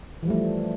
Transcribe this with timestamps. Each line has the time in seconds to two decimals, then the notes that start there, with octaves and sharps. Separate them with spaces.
0.23 E3
0.25 F3
0.28 G3
0.30 A3